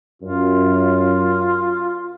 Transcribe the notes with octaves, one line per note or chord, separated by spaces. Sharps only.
F#2 F4